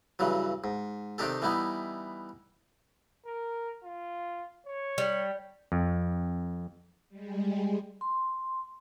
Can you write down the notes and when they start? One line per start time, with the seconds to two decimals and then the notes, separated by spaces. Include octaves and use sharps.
0.19 G2 C#3 E3 F#3
0.64 G#2
1.18 C3 D#3 D4 D#4 G4 A4
1.42 E3 G3 B3 D#4 E4
3.26 A#4
3.84 F4
4.66 C#5
4.98 G3
5.72 F2
7.09 G3 G#3
8.01 C6